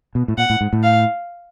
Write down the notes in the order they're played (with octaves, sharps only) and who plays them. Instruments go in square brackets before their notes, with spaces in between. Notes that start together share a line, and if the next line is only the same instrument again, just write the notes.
[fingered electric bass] B2
A2
[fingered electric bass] A#2 [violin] F#5
[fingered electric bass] A2
G#2
A2
[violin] F5